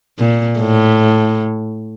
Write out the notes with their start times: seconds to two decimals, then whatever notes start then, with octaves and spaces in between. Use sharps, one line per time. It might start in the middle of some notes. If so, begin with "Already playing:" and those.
0.19 A#2
0.58 A2